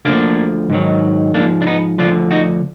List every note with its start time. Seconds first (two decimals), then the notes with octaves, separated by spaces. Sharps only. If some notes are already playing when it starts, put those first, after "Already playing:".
0.05 D2 D3 F3 A#3 D4
0.70 G#2 D#3 F#3
1.34 G#2 F3 A#3 D4
1.62 D4
1.67 B3 D#4
1.98 D2 D3 F3 D4 F4
2.31 D#4 F#4